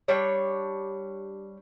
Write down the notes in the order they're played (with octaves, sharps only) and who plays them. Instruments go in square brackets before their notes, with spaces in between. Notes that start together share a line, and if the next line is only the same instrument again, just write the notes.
[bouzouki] G3 D4 C#5